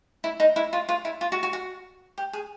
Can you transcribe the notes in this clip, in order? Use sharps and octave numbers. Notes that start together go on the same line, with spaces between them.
E4
D#4
E4
F4
F4
E4
F4
F#4
F#4
F#4
G4
G#4